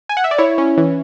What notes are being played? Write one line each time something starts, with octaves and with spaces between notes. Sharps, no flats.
G#5
F#5
E5
D5
E4 C#5
C#4
E3